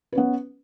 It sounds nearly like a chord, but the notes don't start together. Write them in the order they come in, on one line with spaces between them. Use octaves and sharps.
B4 C#4 B3